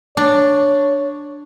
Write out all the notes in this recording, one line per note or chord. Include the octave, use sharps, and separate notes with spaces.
D4 C#5